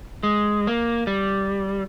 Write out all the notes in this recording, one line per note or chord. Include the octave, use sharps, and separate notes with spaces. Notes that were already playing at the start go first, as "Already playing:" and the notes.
G#3
A#3
G3